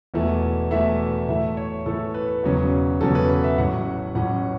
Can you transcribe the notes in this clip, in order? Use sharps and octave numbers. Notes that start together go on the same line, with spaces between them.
E1 E2 E3 A3
E1 E2 E3 A3 E5
A2 E3 A3 E5
C#5
A2 E3 A3 A4
B4
E1 E2 C#3 F#3 C#4
E1 E2 C#3 F#3 C#4 A4
B4
B4
E5
A1 A2 F#3 C#4 F#5
A1 A2 F#3 C#4 F#5